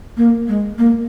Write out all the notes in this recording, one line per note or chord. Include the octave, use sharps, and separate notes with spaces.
A#3
G#3
A#3